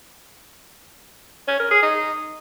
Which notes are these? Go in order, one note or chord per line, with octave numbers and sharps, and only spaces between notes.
C#4
A#4
G#4
D#4